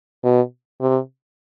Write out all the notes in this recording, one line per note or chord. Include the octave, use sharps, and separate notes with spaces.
B2
C3